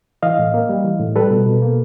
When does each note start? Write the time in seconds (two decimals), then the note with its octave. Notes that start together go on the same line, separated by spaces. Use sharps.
0.23 E3 D#5 F5
0.39 A2
0.54 A#3
0.69 G3
0.84 E3
1.00 A2
1.15 G3 A4 B4
1.31 B2
1.46 B2
1.62 A#3